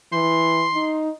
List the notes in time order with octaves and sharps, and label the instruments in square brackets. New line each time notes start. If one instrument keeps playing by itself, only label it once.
[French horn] E3 [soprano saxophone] C6
[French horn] D#4